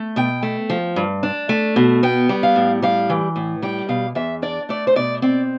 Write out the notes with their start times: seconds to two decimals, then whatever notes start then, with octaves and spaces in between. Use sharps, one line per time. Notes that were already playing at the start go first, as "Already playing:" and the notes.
Already playing: A3
0.16 B2 G5
0.43 A3
0.70 F3
0.96 G2
1.23 D4
1.49 A3
1.76 B2
2.03 B3 G5
2.29 G3
2.43 F5
2.56 A2
2.82 G3 F5
3.10 E3
3.36 A2
3.62 G3 G5
3.89 B2 F5
4.15 E2 E5
4.42 D4 D5
4.69 A3 D5
4.87 C5
4.96 B2 D5
5.22 C4 D5